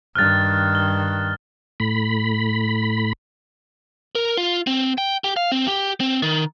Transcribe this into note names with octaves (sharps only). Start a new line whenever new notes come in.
G2 D#3 F6 F#6 A6
G7
A2 B5
A#4
F4
C4
G5
G4
F5
C4
G4
C4
D#3